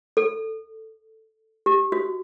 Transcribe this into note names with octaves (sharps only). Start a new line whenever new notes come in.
A4
G4
F#4